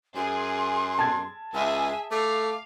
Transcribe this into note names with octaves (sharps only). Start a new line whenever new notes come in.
F#2 G#4 C6
A5 G#6
C#2 G#4 E5 G#5
A3 F5 D6